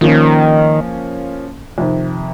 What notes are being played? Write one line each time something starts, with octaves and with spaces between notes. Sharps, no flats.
D#3 F3 A#3 C#4
F2 C3 D#3